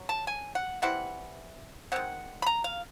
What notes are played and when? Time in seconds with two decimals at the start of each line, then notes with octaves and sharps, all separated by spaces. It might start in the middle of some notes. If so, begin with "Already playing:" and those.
Already playing: F#3
0.09 A5
0.27 G#5
0.55 F#5
0.82 E3 G3 C4 E4 F#5
1.92 D#3 G#3 C4 F#5
2.42 B5
2.46 A#5
2.64 F5